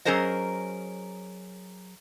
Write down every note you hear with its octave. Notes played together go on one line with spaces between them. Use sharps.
F#3 C#4 G#4 A#4 C5 D#5